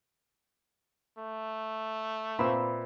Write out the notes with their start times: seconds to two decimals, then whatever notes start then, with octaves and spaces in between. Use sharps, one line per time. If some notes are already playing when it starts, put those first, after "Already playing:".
1.18 A3
2.39 A#2 C4 B4 D5 E5